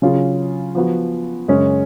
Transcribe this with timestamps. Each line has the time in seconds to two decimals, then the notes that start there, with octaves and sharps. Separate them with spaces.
0.02 C#3 F#3 C#4 F4 G#4
0.75 F3 B3 F#4
1.48 F#2 C#3 G#3 C#4